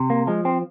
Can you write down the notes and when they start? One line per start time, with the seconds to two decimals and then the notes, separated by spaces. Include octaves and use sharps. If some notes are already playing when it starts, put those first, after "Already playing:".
Already playing: C3
0.10 A#3
0.27 F3 G#3
0.45 C4